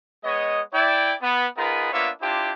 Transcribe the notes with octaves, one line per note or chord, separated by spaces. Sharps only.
G#3 B3 C#5 D#5
E4 D5 G5
B3
B3 D#4 F4 G#4 A#4 B4
A#3 B3 D4 F4 C#5 E5
D4 E4 F4 G4 C5